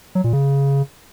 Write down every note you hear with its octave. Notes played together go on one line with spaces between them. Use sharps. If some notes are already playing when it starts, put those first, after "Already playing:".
F#3
A#2
C#3